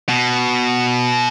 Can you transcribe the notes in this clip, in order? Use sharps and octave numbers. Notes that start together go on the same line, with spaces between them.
B2